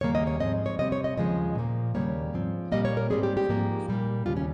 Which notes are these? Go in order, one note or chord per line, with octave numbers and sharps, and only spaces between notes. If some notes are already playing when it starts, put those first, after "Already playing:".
D#2 C#3 G3 A#3 C#5
D#5
C#5
G#2 F3 G#3 C4 D#5
C#5
C3 G3 C4 D#5
C#5
D#5
D#2 C#3 F3 G#3 D#5
A#2 F3 A#3
D#2 C#3 G3 A#3 C#5
G#2 F3 C4
A#2 G3 A#3 D#5
C#5
A#4
G#2 G3 C4 G#4
G4
G4
G#2 F3 A#3
A#2 G3 A#3
D#2 C#3 G3 F4
C#4